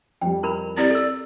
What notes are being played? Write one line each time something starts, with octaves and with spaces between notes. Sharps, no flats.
F2 G3 G5
E4 A#4 B5
C4 E4 G4 D5
A4 E6